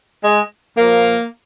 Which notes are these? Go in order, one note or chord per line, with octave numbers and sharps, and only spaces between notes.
G#3
A#2 F3 A#3